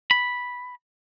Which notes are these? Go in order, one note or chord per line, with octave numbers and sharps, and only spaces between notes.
B5